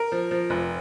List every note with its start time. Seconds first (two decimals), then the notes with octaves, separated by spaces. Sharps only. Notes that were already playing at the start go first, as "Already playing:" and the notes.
Already playing: A#4
0.12 F3
0.31 F3
0.50 F1